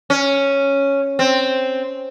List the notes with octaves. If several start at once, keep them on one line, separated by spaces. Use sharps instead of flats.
C#4
C4